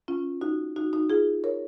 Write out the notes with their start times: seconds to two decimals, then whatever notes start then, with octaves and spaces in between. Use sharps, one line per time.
0.08 C#4 F4
0.41 D#4 F#4
0.76 D#4 F#4
0.93 D#4 F#4
1.10 F4 G#4
1.44 A#4 C#5